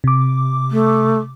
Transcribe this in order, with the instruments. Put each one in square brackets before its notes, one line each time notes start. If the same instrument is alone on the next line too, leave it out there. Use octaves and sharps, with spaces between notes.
[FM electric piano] C3 D6
[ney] A3